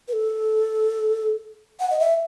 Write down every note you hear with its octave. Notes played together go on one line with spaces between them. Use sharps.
B4
A4
F#5
D#5
E5